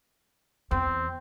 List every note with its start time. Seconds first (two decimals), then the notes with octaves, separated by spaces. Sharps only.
0.71 E2 C4